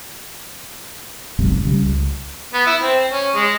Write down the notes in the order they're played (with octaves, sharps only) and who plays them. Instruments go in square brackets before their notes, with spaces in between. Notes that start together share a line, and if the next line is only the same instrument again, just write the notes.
[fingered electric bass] F#1 B1 G#2 C3
C#3 F#3 G3
C#2
[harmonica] B3
E4
C4
C#4
G#3